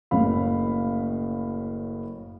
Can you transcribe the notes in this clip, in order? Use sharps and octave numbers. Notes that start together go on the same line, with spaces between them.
F#1 A2 C#4 F5 B5